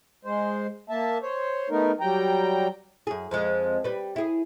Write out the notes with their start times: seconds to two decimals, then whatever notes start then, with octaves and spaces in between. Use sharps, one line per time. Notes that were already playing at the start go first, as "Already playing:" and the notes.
0.25 G#3 C5
0.90 A#3 E5 A5
1.22 C5 C#5
1.70 A3 B3 D#4 A#4
2.00 F#3 G3 G5 A#5
3.07 F#2 G#4
3.31 F2 F3 G#3
3.84 G3 B4
4.16 E4 G#4